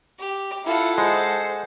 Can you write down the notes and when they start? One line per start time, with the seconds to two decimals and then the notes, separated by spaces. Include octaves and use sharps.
0.18 G4
0.65 E4 F4 A4 F#5
0.98 G#3 C5